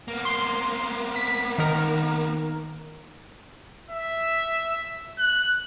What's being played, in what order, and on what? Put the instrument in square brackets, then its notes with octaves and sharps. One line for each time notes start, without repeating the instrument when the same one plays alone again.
[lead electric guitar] A#3 B3
[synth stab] C6
B6
D#3 A#4
[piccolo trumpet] E5
F#6